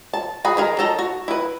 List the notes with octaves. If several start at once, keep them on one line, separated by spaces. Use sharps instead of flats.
A5
F#4 G#4 B5
D#3 G#4 A#4
D#4 A4 A5 A#5
F#4
E4 B4